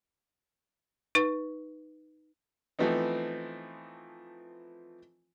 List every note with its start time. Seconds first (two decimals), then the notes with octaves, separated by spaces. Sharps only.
1.15 D#4 B4
2.79 E3 F3 A3 B3 C4 D#4